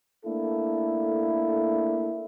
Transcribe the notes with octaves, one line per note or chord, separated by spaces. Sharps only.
A3 A#3 D4 E4 A4